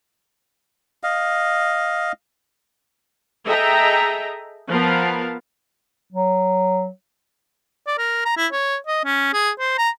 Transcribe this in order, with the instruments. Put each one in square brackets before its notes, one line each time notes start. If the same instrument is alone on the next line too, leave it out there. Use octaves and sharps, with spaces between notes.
[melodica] D#5 F5
[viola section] G#4 A4 D#5 E5 G5 A#5
F3 B3 A#4 F5 A5
[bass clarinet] F#3
[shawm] D5
A#4
A#5
E4
C#5
D#5
C#4
G#4
C5
A#5